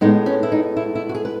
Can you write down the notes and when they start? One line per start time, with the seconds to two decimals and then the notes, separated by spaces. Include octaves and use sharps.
0.01 A2 G#3 B3 D#4
0.26 C#4
0.43 E4
0.52 D#4
0.77 E4
0.95 E4
1.09 F#4
1.15 G#4
1.25 B4